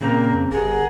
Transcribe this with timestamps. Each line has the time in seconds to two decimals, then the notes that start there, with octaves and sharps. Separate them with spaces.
0.01 A#2 C#3 A#3 C4 A#5
0.33 F2
0.52 G1 G#4 A#4 F#5